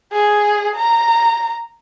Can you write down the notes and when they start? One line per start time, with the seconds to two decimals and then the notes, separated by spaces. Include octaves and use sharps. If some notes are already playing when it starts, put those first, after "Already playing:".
0.12 G#4
0.76 A#5